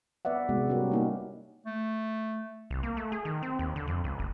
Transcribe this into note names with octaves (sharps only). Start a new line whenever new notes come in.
B3 B4 D5 E5 F#5
C3 G#3 B3 D#4 F#4
G3 G#3 C#4 F#4 G4 A#4
A#3 D#4 A#4
A3
C2
A#3
A3
G#4
D#3
C4
D#2
D3
F2
C#2
F#1